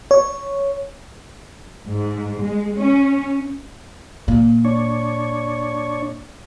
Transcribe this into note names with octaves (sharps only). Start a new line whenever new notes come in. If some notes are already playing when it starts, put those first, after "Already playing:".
C#5
G#2
G#3
C#4
A#2
D4 C#5